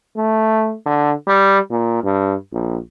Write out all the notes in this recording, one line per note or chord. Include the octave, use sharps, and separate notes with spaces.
A3
D3
G3
A#2
G2
A#1